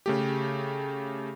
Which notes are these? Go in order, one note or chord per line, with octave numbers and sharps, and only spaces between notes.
C#3 A3 G4